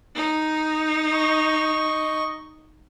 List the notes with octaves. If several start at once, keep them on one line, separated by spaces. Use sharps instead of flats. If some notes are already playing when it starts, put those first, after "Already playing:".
D#4
D#5 C#6